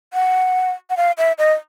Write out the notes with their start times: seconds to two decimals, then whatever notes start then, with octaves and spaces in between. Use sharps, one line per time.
0.13 F#5
0.90 F#5
0.97 F5
1.18 E5
1.38 D#5